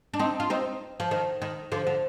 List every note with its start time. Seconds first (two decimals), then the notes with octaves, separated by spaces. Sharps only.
0.14 D4
0.19 C4 D#4
0.40 F4
0.50 C4 D#4
1.00 F3
1.11 D#3
1.42 D#3
1.72 D3 F3
1.87 D3